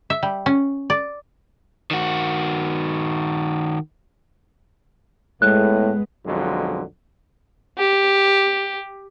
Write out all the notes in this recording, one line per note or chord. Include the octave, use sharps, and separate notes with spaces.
E5
G3
C#4
D5
D#3 F#4
A2 G#3 B3 F#6
B1 F2 D3 F#3 G#3
G4